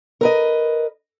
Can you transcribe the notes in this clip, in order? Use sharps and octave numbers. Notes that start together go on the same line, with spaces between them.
A#4 B4 D#5